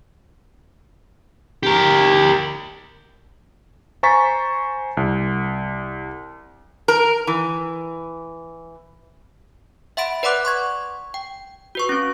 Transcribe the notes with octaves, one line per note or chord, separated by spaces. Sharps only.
G4 A#4
C5 G#5 A#5 C#6 A6 B6
C2
A#4
E3
E5 F#5 B5 C6 A6 D7
B4 D5 F#5 C6 D6 F#6
C6 C#6 G#6
G5
F#4 B4 C#6
C4 C#4